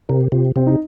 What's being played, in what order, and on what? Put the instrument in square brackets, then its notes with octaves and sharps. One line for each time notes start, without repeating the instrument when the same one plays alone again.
[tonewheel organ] C3 [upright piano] A#4
[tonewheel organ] C3 [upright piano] F4
[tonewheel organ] C3 [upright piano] C4
[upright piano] D#4